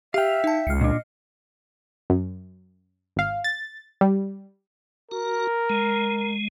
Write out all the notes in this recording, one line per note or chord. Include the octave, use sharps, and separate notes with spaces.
G4 E5 F5 G5 F6 F7
D#4 A5
C#2 F6 C7 C#7
A#2 D4 D#5
F#2
G#1 F5
A6
G3
F#4 A#4
G#3